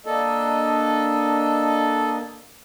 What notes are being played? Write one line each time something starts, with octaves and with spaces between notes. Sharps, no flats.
A#3 D4 A4 D#5